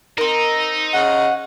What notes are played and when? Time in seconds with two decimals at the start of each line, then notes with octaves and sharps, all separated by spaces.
0.18 C4 D#4 A#4
0.93 C#3 D#5 F#5